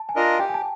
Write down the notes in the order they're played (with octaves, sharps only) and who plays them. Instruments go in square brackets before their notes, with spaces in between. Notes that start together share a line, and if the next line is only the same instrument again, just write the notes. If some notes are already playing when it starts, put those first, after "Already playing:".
Already playing: [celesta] A5
G#5
[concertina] D4 F4 A#4 D#5
[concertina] G4 [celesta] G5
[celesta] G#5
A5